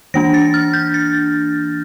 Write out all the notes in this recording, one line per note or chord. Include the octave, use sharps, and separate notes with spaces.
E3 A#3 D4 A#6
A6
F6
G6
A6